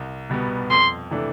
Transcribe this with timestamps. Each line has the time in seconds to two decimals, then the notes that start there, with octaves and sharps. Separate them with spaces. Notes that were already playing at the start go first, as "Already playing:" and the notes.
Already playing: C2
0.30 B2 G3 B3
0.70 F2 C6
1.10 C3 E3 A3 D4